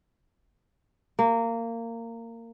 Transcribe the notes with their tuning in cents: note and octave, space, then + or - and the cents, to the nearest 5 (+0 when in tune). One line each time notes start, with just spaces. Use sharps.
A#3 -20